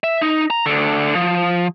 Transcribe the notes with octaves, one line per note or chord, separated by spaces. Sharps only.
E5
D#4
A#5
D2 D3
F3